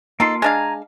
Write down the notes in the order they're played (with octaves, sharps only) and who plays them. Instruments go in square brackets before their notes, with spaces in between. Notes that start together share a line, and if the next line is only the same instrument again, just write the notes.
[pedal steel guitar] A#3 F4 C6 [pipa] D#4 A4
[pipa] G#3 D4 F5 [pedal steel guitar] G#5 A#5